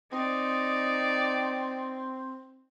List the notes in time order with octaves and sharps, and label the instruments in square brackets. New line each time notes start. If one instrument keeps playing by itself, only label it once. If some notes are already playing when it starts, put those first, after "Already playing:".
[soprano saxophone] C4 [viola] D#4 D5